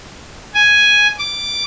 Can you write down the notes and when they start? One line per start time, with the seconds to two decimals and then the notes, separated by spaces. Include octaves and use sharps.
0.54 G#5
1.18 D6